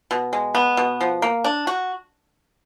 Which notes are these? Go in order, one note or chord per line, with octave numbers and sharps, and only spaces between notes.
B2
G#3
B3
B2
F3
A#3
D4
F#4